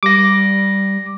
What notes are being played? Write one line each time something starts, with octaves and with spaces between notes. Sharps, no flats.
G3 D6 A#6